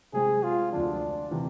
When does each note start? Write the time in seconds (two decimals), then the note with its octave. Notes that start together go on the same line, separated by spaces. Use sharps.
0.13 C3 G#3 C4 G#4
0.43 F4
0.72 D2 D3 F3 D4
1.31 C3 E3